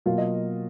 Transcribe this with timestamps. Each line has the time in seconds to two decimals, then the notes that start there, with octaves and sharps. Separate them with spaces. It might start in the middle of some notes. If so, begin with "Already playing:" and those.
0.06 B2 F#3 A#3 F4 F5
0.18 D#5